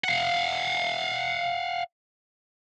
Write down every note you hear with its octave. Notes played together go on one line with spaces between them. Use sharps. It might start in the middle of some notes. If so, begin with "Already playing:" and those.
F5 F#5